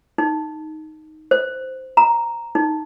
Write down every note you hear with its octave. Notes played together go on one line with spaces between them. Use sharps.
D#4
C5
A#5
D#4